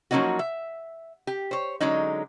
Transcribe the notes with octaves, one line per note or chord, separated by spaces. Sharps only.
F3 F#3 A#3 C#4 D#4 F#4
E5
G4
C5 C#5
D3 F#3 G#3 C#4 D#4